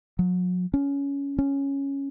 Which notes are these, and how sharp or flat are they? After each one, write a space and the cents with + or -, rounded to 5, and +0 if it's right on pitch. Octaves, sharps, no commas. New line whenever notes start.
F#3 -40
C#4 +15
C#4 +0